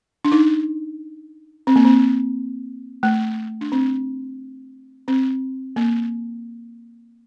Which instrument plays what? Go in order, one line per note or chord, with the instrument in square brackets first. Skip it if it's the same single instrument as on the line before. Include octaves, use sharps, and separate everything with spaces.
[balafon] D4
D#4
C4
A#3
C4
A3
D4
C4
C4
A#3